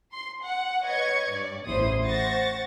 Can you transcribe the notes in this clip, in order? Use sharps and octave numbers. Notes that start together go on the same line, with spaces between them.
C6
F#5
B4 C#5 D#5 C#6 G#6
G2 D5
A1 E2 E4 C5 C6 D#6
C5 F#5 C#6 A6 A#6